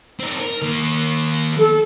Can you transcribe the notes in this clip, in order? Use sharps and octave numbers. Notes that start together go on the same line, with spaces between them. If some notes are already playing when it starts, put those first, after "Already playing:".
C4 D#4
A#4
D#3 A#3
A4